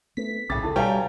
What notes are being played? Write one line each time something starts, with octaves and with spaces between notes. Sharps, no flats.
A3 B3 B6
B1 A2 C#3 G5 D6 A6
D2 D#4 A4
B2 G3 B4 C#5 F5 G5 G#5 A#5